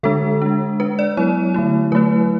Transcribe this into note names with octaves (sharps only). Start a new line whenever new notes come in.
D3 G#3 D4 A4
G#3 D4
G#3 D4 B4
D5
F#3 B3 E4 C#5
D3 A3 E4
F#3 A3 E4 B4